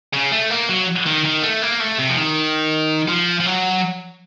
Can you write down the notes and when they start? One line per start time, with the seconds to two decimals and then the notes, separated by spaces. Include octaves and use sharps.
0.14 C#3
0.32 A3
0.51 A#3
0.70 F#3
1.06 D#3
1.25 D#3
1.42 A3
1.62 A#3
1.80 A3
1.99 C3
2.09 F3
2.17 D#3
3.09 F3
3.40 F3
3.46 F#3